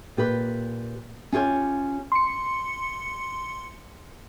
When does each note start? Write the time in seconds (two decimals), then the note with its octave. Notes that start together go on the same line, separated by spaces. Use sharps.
0.17 A#2 G4 B4
1.32 C#4 F4 G4 C#5
2.12 C6 C#7